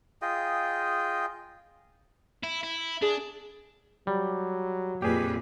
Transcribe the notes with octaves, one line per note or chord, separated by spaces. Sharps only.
F4 G#4 D#5 G5
E4
E4
D4 G#4
F#3 G3
F2 A#2 G4 G#4 B4